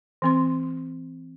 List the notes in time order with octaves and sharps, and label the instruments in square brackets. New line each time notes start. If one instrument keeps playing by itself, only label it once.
[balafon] E3 C4 C6